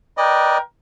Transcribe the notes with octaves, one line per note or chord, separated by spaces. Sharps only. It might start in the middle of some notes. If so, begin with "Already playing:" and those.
A#4 B4 D5 D#5 G5